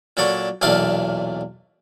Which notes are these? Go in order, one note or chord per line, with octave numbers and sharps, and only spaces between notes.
A#2 F#3 D4 A4 C#6
B1 E2 A#2 D4 A4 F5